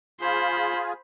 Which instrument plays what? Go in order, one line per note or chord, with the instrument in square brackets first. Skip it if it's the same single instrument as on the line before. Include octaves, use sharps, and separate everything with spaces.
[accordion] F4 G#4 [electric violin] C5 B5